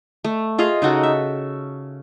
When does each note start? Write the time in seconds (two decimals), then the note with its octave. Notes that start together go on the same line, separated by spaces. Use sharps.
0.24 A3
0.58 F4 G#4 D#5 F5
0.82 C#3 D#4 F#4 A4
1.03 E5